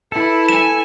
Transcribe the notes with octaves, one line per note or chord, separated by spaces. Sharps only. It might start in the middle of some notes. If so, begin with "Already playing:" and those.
E4 A4 B4
G#5 E7